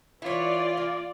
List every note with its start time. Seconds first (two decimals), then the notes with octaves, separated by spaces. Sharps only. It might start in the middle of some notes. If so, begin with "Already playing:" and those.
0.22 E3 E4 F4 C#5 D5
0.77 A#3 D5